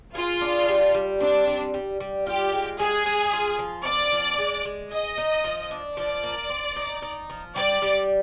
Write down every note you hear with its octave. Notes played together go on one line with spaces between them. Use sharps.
F4 G#4
D4
G3
G3
C4 D4
G3
G3
G3
F4 G4
G#3
G#3 G#4
G#3
F4
F3
C4 D5
F3
G#3
G#3
G#4 D#5
D#4
F3
D4
F3 D5
A#3
C4
D#4
D#4
F3
G3 D5
G3